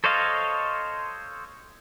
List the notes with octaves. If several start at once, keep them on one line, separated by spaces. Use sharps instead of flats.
A4 C5 C#5 D#5 F5